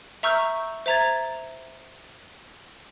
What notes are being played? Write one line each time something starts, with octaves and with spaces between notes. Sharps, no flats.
E5 A#5 C#6 E6 F6 G6
C5 E5 A#5 G#6 A6